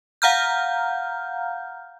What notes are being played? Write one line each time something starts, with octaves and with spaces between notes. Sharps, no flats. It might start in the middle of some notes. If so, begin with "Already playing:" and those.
F5 F#5 A#5 F6 G6